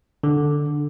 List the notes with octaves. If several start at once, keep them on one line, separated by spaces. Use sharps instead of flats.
D3